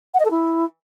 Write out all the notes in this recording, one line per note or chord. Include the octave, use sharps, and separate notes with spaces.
F#5
D#5
A4
E4